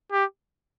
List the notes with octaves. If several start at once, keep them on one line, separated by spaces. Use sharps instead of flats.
G4